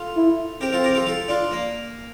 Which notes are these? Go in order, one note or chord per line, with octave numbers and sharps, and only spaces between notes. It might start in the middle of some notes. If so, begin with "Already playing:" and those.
Already playing: F4 A4
E4
C4 G4 A#4
F4 A4
G4 A#4
F4 A4
F4 A4
D4 F4
A#3